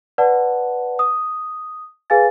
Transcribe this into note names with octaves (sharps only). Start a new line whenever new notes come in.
B4 D5 F#5 A5
D#6
G#4 B4 F5 G#5 A6